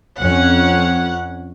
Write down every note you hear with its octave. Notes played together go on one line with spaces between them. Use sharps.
F2 C#4 F#5